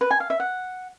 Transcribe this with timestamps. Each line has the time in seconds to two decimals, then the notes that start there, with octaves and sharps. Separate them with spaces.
0.01 B4
0.11 G#5
0.20 F5
0.30 E5
0.40 F#5